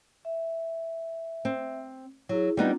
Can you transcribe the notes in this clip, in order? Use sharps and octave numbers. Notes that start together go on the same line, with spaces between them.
E5
C4
F#3 E4 G#4
G3 B3 C4 D4 D#4 F4